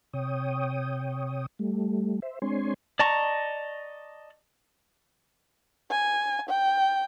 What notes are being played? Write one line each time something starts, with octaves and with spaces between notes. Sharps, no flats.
C3 C#5 G5 D#6
G3 A3
C5 E5
G#3 C4 D4 C#5 G#5 C6
D5 D#5 A5 A#5 C#6
G#5
G5